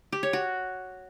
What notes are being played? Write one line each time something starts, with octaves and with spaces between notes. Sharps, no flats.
G4
C#5
F#4